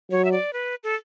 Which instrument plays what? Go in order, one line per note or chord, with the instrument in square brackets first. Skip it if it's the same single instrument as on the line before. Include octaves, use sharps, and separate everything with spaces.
[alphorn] F#3 [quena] C#5
[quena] E5
D5
B4
A4